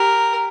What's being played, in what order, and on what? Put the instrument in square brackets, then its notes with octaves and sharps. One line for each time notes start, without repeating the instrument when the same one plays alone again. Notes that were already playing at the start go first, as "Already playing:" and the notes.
Already playing: [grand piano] G4 [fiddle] A#4